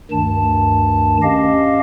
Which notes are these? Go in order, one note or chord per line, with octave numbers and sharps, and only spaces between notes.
D2 G2 D#3 A5
C#4 G4 D#5 F5